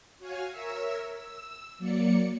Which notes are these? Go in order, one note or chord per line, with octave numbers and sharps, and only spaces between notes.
F#4 C#5 F5 G#5
A#4 C#5 E5 E6
E6
F#3 A#3 D5 C#7